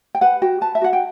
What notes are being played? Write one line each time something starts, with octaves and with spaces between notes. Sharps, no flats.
G5
B4 F#5
F#4 G5
B4 A5
E5
F#4 F#5
G5